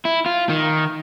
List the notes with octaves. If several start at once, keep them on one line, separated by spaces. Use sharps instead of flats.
E4
F4
D#3